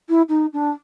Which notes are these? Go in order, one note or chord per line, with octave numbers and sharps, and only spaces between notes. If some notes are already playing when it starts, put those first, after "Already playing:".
E4
D#4
D4